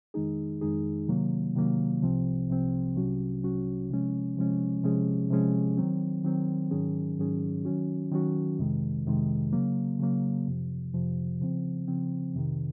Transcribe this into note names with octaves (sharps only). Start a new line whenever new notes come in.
F2 D#3 G#3 D#4 G#4
F2 D#3 G#3 D#4 G#4
C3 D#3 F#3 A#3
C3 D#3 F#3 A#3
C2 C3 F3 C4
C2 C3 F3 C4
C2 C3 F#3 C#4 F#4
C2 C3 F#3 C#4 F#4
C3 F3 G#3 C#4
C3 F3 G#3 C#4
C3 F3 G#3 C#4 G#4
C3 F3 G#3 C#4 G#4
D#3 F#3 C4
D#3 F#3 C4
G#2 D#3 F#3 C#4 G#4
G#2 D#3 F#3 C#4 G#4
D#3 F#3 C#4 F#4
D#3 F#3 C#4 F#4
F2 C3 D#3 G#3
F2 C3 D#3 G#3
C#3 F#3 A#3
C#3 F#3 A#3
F2 C3 F3
F2 C3 F3
C#3 F3 C4
C#3 F3 C4
F2 C3 D#3